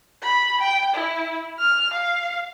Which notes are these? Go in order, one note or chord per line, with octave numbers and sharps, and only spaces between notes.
B5
G5
E4
F6
F5